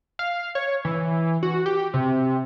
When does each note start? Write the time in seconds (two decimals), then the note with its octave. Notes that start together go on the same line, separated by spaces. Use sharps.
0.19 F5
0.55 C#5
0.85 E3
1.43 F#4
1.66 G4
1.94 C3